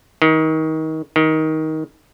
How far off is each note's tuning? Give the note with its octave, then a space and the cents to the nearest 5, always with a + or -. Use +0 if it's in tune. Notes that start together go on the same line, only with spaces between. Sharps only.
D#3 +25
D#3 +15